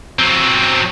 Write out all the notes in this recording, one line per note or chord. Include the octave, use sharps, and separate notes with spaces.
F#3 C4